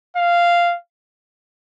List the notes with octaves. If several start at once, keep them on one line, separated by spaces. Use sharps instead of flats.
F5